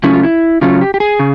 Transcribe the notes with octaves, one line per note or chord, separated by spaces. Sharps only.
C#3 F#3 A3 C#4 E4
F4
E4
C#3 F#3 A3 C#4 F4
G4
G4
G#4
C#3